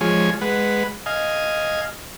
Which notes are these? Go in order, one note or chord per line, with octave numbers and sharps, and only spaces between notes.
F3 G#3 C#5 G#5
G#3 B4 F#5
D#5 F5 G#5